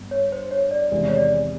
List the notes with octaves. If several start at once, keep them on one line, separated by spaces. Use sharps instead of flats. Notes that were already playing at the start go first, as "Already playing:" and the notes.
Already playing: G2 B3
C#5
C5
C#5
D5
E2 C3 D#3 G#3 D5
C#5
D5